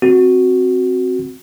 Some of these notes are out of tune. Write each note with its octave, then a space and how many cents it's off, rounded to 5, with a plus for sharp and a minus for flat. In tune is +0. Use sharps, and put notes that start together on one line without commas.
C4 +0 F#4 +0